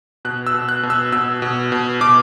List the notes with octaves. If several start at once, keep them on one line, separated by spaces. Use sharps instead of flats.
B2 F#6
E6
B2
F#6
B2
E6
B2 E6
B2
B2
B2 D6